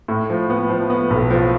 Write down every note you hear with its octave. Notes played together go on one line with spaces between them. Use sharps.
A2
F3
B3
F3
B3
B1
F3